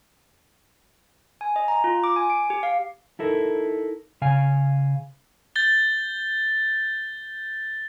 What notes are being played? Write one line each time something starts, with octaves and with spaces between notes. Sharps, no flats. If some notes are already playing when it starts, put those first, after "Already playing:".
G#5
D#5
A#5
F4
D6
G#5
D7
G4
F5
D#4 E4 A4 A#4
C#3 F5 G#5
G6 A6 G7